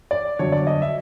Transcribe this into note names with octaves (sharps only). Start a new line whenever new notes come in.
D5
G1 F2 D3 F#3 C#5
D5
D#5
E5